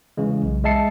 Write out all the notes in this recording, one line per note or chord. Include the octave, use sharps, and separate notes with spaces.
C#3 E3 G#3
B1
G#3 D#5 E5 A5 C7 C#7